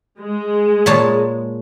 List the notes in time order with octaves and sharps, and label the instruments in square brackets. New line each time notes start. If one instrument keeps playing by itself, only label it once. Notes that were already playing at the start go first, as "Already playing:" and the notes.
[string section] G#3
[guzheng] A#2 C#5 A5